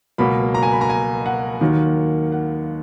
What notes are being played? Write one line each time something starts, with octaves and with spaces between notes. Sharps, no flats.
C#2 B2 F#3 A#3 B5
A#5
G#5
B5
A#5
G#5
F#5
D#2 D#3 F#3 A#3
F#5